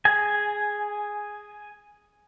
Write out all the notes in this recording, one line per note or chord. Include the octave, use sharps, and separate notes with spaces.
G#4 G#5